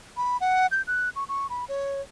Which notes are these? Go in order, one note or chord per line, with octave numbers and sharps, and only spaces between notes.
B5
F#5
G6
F#6
C#6
C#6
B5
C#5